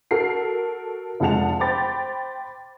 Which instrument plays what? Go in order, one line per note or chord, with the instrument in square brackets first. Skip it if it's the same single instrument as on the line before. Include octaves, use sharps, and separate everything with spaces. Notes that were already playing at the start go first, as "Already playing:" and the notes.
[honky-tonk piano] F#4 A4 A#4 C7
F1 F3 G#3 F#5 A5 F7
C5 G5 B5 D6 A6